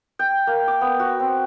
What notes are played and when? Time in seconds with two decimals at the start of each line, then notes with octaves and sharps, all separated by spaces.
0.19 G5
0.47 A#3
0.68 D6
0.81 B3
0.99 F#4
1.20 C4